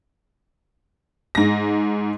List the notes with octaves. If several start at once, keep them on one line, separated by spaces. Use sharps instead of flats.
G#2 A#6